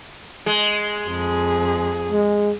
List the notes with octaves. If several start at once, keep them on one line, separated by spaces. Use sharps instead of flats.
G#3
F2 G#4
G#3